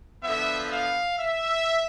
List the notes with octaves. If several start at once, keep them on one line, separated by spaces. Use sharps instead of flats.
D3 F3 B3 E5
F5
E5